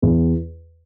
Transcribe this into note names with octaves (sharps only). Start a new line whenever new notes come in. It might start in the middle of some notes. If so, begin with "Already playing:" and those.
E2